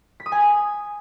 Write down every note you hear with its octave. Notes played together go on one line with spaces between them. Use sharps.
B6
D#6
G#5
G#6